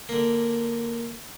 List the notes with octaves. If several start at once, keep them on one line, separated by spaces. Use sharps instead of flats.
D3 A#3